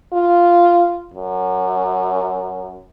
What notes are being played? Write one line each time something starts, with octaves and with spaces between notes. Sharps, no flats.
F4
F#2